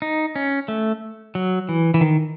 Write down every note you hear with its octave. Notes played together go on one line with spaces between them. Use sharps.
D#4
C#4
A3
F#3
E3
E3
D#3